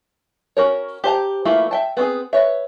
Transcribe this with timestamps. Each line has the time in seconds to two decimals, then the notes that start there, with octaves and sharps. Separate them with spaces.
0.57 C#4 F#4 A#4 C#5
1.04 G4 C5 A5 A#5
1.45 E3 A3 A#3 E4 F4
1.71 E5 G5 A5
1.97 B3 C4 F#4 G#4
2.33 B4 C#5 E5